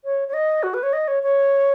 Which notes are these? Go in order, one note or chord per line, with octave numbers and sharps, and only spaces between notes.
C#5
C#5
D#5
F#4
B4
C#5
D#5
C#5
C#5